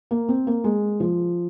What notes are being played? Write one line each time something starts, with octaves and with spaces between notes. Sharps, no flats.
A#3
C4
A#3
G#3
F3